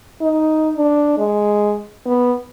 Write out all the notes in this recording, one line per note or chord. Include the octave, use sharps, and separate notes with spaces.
D#4
D4
G#3
B3